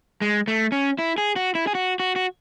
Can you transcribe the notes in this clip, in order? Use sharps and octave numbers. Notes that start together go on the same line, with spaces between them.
G#3
A3
C#4
E4
G#4
F#4
E4
G#4
F#4
F#4
F#4